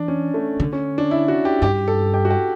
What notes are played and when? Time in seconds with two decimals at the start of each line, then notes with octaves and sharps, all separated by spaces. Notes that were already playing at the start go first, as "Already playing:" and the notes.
Already playing: E3 D4
0.08 C#4
0.34 A3
0.60 D3
0.73 C#4
0.98 D4
1.11 E4
1.28 F#4
1.45 G4
1.62 G2 G4
1.88 A4
2.14 G4
2.25 F#4
2.30 G4